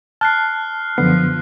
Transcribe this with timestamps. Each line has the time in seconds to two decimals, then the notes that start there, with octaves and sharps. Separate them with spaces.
0.21 A5 F6 F#6 C7
0.98 F#2 D3 F3 B3 C7